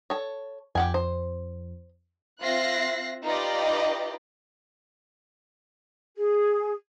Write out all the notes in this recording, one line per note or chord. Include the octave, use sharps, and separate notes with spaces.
A4 C#5
F2 G4 F#5 G#5
C5
C4 F4 E5 F#6 A#6 C7
D#4 F4 G4 B4 D5 D#5
G#4